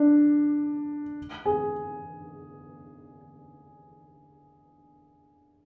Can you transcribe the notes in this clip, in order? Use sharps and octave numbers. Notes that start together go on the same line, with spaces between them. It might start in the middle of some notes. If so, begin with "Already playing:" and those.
Already playing: D4
G#4